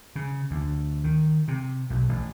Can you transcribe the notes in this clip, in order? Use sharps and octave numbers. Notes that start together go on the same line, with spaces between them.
C#3
D2
D#3
C3
B1
A1